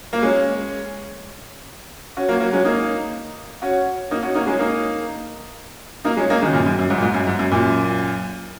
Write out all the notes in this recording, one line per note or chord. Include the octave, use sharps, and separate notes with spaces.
A#3
G#3 C#4
C#4 F#4
F#3 A#3
F#3 A#3
G#3 C#4
A#3 D#4
C#4 F#4
A#3 D#4
C#4 F#4
A#3 D#4
G#3 C#4
A#3 D#4
A#3 D#4
G#3 C#4
A#3 D#4
D#3 G#3
C#3
F#2 A#2
F#2
F#2
G#2
A#2
G#2
F#2
G#2
F#2
F#2 A#2